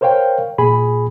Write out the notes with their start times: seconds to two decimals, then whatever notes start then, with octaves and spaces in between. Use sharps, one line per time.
0.01 A#4 C5 C#5 F5 G5
0.58 A#2 G#4 G#5 B5